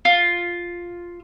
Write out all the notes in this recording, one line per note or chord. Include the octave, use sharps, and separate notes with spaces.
F4